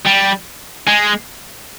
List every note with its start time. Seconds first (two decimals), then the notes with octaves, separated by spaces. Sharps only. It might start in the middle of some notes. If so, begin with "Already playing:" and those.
0.07 G3
0.87 G#3